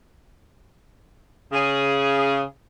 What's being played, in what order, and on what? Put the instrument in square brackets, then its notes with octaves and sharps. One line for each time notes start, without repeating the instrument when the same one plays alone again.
[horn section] C#3 G#4